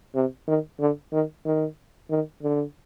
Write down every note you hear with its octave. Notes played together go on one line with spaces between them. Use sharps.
C3
D#3
D3
D#3
D#3
D#3
D3